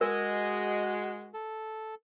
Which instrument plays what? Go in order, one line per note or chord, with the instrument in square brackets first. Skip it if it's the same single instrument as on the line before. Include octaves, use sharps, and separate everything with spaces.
[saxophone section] G#3 [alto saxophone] F#4 [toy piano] A#4 [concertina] D#5 G#5
[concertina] A4